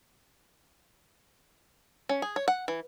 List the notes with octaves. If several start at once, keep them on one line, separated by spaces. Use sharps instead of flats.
C#4
G#4
C#5
F#5
E3